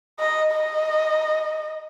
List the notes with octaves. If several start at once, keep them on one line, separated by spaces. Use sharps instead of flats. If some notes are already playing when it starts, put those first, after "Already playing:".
D#5
D#5